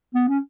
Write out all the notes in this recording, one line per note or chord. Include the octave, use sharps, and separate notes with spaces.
B3
C#4